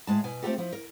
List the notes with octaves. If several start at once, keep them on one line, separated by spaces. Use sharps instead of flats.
A2 G#3 A5
B2 G#5
A3 C4 D#4 F4 G4 A4
F3 E4
A#4